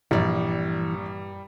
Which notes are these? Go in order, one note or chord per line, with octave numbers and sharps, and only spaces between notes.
A#1 G2 E3 G3 D5